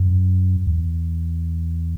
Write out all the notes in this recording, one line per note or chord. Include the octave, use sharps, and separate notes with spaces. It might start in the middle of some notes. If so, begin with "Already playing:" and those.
Already playing: F#2
E2